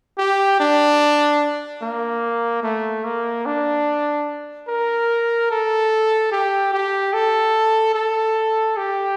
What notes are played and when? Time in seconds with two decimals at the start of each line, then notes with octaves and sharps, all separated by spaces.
0.18 G4
0.60 D4
1.82 A#3
2.63 A3
3.04 A#3
3.46 D4
4.68 A#4
5.51 A4
6.32 G4
6.73 G4
7.13 A4
7.95 A4
8.77 G4